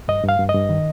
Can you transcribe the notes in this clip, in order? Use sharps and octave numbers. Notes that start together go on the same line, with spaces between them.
G2 D#5
G2 F5
G2
D#5
G2
D#3